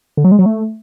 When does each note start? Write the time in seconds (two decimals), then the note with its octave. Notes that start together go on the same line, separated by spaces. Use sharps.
0.17 D3
0.24 F#3
0.32 G#3
0.39 F#3
0.46 A3